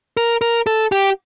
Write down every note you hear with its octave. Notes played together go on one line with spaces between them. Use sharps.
A#4
A#4
A4
G4